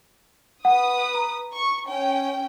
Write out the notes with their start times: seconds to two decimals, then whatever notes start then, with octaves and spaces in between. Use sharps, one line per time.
0.65 B4 F#5 D#6
1.15 A#5
1.54 C#6
1.88 C#4 G5